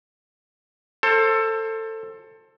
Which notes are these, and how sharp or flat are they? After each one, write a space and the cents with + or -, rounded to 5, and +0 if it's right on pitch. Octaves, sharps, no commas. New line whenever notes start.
A4 +20 C5 +25